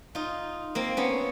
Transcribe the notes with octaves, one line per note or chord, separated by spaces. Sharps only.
D#4 F4
A#3 C4
B3 C#4